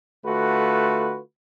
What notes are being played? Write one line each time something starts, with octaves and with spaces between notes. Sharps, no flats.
D3 A3 F4 F#4 B4